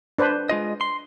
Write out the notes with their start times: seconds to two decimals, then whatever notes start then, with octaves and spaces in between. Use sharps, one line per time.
0.18 D4 B4 C5
0.49 G#3 F4 D#5
0.81 C6